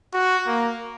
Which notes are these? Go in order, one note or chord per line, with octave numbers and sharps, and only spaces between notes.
F#4
A#3